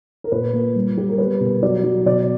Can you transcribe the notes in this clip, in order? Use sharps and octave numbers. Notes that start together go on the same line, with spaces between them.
A#4
A#2 B4
A#3
G3
G3 G4
A#4
B3 B4
B2
F#3 D5
F#3
B2 D5